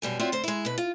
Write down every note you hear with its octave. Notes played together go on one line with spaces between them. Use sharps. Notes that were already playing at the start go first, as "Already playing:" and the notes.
F#2 B2 G3 G#5
C4 F4 F#4 C#5 D5 E5
D2 C5
G#3 E4
B2 B4
F4